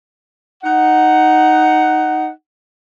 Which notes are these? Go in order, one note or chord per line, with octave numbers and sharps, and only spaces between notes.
D#4 F#5